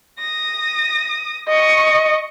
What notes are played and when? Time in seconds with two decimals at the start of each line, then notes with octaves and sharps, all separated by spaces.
0.19 D#6 A#6
1.49 D#5 C#6